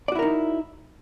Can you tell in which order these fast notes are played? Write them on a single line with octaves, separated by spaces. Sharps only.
D5 F#4 E4 A#4 D#4